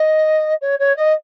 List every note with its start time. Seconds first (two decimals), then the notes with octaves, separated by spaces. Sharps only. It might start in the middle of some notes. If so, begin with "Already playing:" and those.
Already playing: D#5
0.61 C#5
0.79 C#5
0.96 D#5